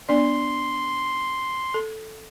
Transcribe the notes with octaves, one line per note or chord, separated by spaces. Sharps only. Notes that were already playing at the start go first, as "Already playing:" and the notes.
B3 D4 D5 C6
A4